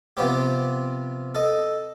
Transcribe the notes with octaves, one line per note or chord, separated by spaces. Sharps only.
C3 F3 B3 C4 G4
A4 D#5